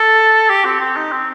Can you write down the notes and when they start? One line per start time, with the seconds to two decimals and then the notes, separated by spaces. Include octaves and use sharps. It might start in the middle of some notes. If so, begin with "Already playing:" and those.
Already playing: A4
0.50 G4
0.65 C4
0.81 C4
0.97 D#4
1.12 C4